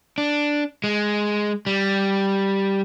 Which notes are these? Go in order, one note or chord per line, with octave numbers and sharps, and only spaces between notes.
D4
G#3
G3